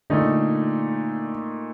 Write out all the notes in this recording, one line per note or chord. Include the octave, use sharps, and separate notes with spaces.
A#2 D3 A3 D#4